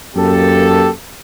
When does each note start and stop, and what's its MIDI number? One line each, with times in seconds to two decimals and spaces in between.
0.16 0.90 42
0.16 0.90 58
0.16 0.90 67
0.16 0.90 69